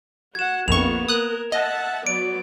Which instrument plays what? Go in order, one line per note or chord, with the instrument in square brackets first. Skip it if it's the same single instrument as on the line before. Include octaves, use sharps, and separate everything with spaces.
[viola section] F#4 F#5 [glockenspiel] G#6 E7
[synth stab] A#1 F2 C#6 [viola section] A#3 B3 F4 [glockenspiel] F7
[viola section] A#4 [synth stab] D#6 F#6
[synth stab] D#5 [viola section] E5 F#5 A5
[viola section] F#3 B3 D5 [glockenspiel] D7